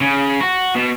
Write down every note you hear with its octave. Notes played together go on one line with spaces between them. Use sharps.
C#3
F#4
B2